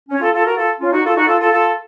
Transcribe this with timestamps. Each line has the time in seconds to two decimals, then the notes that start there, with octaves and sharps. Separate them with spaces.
0.09 C#4
0.20 F4 A4
0.33 F4 A4
0.44 F#4 A#4
0.56 F4 A4
0.80 C#4 F4
0.92 D#4 F#4
1.04 F4 A4
1.16 D#4 F#4
1.27 F4 A4
1.39 F4 A4
1.51 F4 A4